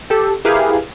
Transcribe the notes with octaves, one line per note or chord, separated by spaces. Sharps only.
G4 A4
E4 G4 G#4 A#4 B4 F5